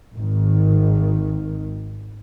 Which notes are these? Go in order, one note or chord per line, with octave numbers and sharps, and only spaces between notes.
G#1 D#3